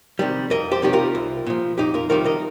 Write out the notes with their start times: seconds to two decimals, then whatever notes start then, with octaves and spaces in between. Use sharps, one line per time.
0.19 C3 D#3 G3
0.50 F2 A#4 D#5
0.71 G4 C5
0.82 C3 D#3 G3 G4
0.93 F4 A#4
1.15 C2
1.47 A#2 F3
1.78 F2 D#4 G4
1.94 F4 A#4
2.10 C3 D#3 G3 F4 A#4
2.25 A#4 D#5